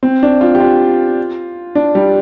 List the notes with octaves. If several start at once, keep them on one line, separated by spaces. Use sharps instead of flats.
C4
D4
F4
G4
F4
D4
G3